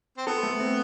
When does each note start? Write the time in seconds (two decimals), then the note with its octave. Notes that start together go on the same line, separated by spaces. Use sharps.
0.17 C4
0.26 B3 A4
0.43 A3
0.60 C4